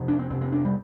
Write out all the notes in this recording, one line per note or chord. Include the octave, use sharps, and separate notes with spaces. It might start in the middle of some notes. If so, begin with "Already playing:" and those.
Already playing: F2 C3
D4
C4
F2 C3 C4
C4
D4
G3